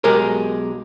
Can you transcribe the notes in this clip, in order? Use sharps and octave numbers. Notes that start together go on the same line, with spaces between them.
B1 G#3 G4 G#4 A#4